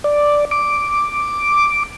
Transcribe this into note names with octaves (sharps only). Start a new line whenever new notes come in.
D5
D6